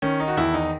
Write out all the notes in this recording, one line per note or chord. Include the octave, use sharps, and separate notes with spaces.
D#3 C#4
D#4
F#4
E2 E4
D#4